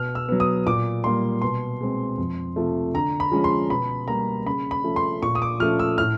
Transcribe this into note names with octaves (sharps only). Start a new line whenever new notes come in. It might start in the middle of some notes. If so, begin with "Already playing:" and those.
Already playing: B2 F6
E6
F#3 B3
D#6
A#2 D6
G3 A#3 C6
B2 C6
G#3 C4
F2
C3 F3 A3
D3 A#5
B5
F3 G#3 C#4
C6
B2 B5
G3 A#3 A#5
C#3 B5
B5
F3 A3 C#4
C6
A#2 C#6
D#6
D6
F3 A3 C#4 F6
E6
A2 F6